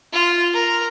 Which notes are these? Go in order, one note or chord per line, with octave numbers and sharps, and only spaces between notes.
F4
A#4